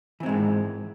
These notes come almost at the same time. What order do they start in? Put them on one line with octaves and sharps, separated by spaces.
E3 C4 G#3 G#2